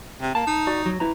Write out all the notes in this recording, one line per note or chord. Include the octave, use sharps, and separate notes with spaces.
C3
A#3 A5
D#4
F#4 D5
F#3
E4 B4 A#5